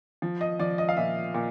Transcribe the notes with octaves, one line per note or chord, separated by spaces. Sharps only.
F3
D#5
F3 D5
D#5
F5
A#2 E5
A#2